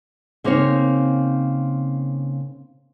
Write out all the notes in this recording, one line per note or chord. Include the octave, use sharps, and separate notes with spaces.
C#3 A#3 C4 D#4 C#5